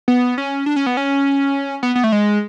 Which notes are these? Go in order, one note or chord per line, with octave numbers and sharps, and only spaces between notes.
B3
C#4
D4
C#4
B3
C#4
B3
B3
A3
G#3